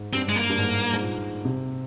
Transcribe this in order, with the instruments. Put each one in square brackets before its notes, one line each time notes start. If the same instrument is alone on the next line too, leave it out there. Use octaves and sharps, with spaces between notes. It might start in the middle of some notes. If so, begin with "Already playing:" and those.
Already playing: [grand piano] G#2
[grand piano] G2 [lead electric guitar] C4
[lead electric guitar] G#3
A#3
[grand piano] G2
G#2
G#2
A#2
C3